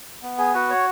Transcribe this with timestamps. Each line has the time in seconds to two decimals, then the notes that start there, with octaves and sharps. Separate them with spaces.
0.23 B3
0.38 G#4
0.54 F#4 B4
0.70 C#5